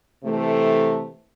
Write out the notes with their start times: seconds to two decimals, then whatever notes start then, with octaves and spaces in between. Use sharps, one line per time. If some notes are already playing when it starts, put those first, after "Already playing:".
0.23 C3 E3 A3